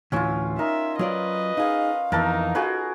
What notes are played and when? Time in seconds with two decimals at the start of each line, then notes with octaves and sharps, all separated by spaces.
0.12 D2 A2 E3 C#4 F4
0.59 D#4 A#4 E5
0.99 F#3 F4 B4 D5 D#5
1.57 D#4 G#4 F5
2.12 F2 E3 B3 D#4 A#4 A5
2.55 F4 F#4 G#4 A4 B4